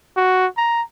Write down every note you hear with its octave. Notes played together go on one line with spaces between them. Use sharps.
F#4
A#5